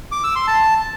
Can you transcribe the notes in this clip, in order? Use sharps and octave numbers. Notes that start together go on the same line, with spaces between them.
D6
E6
C6
A5